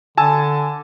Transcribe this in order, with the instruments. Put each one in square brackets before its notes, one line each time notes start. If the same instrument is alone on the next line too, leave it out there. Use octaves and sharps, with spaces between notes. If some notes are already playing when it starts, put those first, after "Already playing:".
[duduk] D3 [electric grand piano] G#5 A5 E6